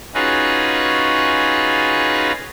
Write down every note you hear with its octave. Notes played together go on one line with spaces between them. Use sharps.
C#4 D#4 F4 F#4 G#4 B4